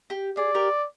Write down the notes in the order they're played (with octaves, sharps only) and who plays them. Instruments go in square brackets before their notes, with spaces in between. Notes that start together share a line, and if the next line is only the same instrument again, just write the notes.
[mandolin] G4
[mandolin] G#4 [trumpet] D5
[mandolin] G4 A#4